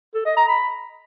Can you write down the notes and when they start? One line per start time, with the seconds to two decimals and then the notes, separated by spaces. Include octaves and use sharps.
0.14 A4
0.25 D#5
0.37 A#5
0.48 B5